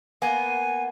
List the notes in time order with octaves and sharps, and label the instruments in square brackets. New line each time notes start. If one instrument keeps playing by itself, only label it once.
[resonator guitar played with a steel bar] A#3 B3 [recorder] G#5